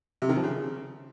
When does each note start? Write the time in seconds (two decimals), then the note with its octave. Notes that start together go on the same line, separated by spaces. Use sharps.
0.22 C3
0.29 D#3
0.36 F3
0.44 C#3